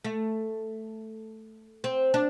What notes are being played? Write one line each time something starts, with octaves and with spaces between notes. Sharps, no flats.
A3
C4
D4